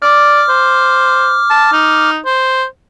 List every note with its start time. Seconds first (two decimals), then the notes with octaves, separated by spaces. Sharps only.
0.02 D5 D6 F6
0.49 C5
1.50 A5
1.72 D#4
2.25 C5